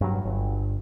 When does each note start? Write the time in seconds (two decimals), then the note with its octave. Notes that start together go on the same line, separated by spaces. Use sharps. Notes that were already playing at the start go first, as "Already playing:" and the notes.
0.01 G2 F#3
0.25 G1